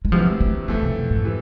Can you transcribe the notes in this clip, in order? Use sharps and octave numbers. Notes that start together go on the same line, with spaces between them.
G#3
D2 C3 E3 F3
G#3
A3
F2 E3 G#3 A3
C3
B2
G#2
C3 E3